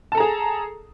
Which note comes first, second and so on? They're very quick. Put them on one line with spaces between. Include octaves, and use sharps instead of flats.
A5 A4 A#5 G#4